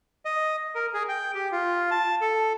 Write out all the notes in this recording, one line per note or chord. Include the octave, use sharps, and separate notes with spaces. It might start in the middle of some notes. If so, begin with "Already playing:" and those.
D#5
A#4
G#4
G5
G4
F4
A5
A4